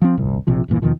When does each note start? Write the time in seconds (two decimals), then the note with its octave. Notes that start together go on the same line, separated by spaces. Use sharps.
0.02 F3 C4
0.17 D1 G1 C2
0.47 A#1 C3 F3
0.68 D1 G1 A#2 E3
0.82 D#2 B2 D#3 F3